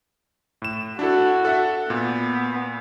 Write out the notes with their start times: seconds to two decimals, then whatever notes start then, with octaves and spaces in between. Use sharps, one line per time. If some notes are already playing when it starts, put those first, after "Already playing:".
0.62 A2 E7
0.99 D4 E4 F#4 A4
1.45 A4 E5 F#5
1.90 A#2 B3